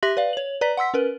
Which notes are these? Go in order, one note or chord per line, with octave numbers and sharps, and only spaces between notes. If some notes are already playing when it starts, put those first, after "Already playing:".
G4 E5 C6 F#6 A#6 F#7
B4 D5 F5
C#5 F#7
B4 D5 A#5 B6
F#5 C6 E6 B6
C#4 A#4 B4